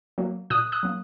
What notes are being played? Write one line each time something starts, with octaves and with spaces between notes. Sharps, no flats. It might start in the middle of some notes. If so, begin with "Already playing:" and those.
F#3 A#3
A#2 D#6 F#6
D#6 F#6
F#3 A#3